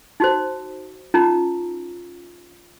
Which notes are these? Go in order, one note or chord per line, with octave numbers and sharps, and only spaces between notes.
D#4 F#4 C5
C#4 D#4 F4 A#5 B5